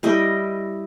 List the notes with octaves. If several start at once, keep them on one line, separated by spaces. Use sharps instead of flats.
G3 E4 D#5 G5